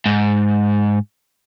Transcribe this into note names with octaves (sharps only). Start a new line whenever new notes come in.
G#2